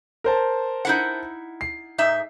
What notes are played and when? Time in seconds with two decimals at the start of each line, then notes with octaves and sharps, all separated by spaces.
0.24 A#4 C5 A5
0.85 D#4 E4 F#5
1.61 C7
1.98 G#2 D#4 E5